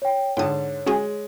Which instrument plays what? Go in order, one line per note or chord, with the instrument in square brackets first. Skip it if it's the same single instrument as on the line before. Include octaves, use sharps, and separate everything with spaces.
[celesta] C#5 G5
[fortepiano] G#2 D3 A5 [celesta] C#5 [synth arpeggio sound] G5 D#6
[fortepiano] G#3 [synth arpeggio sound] C#4 F#4 G#4